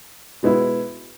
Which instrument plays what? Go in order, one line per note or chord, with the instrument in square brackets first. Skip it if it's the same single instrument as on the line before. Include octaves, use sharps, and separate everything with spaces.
[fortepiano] B2 G#3 B3 E4